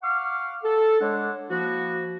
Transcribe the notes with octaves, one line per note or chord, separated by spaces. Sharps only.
F5 F#5 C#6 D6 F6
A4
G#3 D4 A4 C#5 D5 F#5
F3 A#3 E4 F#4